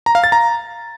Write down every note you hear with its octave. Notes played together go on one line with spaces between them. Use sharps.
A#5
F5
A6
A#5